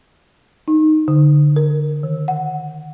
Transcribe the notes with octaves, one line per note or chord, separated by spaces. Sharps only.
D#4
D3
A#4
D#3
F#5